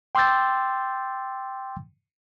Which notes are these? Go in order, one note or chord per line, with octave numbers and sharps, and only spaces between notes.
G5 C6 D6 E6 G6 A6